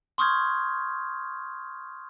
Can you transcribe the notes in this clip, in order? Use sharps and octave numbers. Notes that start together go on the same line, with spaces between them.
C6 C#6 D#6 F6 G6 G#6